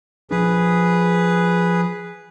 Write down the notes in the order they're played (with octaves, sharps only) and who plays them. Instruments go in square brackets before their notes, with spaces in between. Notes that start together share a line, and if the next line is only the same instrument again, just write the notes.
[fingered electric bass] F3 D4 [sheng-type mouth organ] G#4 B4